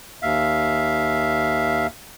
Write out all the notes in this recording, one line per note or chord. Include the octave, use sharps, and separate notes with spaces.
D#2 E5 F5